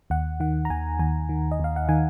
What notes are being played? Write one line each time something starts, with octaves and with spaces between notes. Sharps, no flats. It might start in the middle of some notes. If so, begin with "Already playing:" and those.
D#2 F#5
D#3 F#5
A#5
D#2 G#5
D#2 G#5
D#3
D#5
D#2 F5
F#5
D#3 G#5